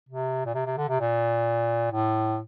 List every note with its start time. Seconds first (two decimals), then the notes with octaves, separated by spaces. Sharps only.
0.09 C3
0.46 A#2
0.55 C3
0.66 C3
0.77 D3
0.89 C3
1.00 A#2
1.91 A2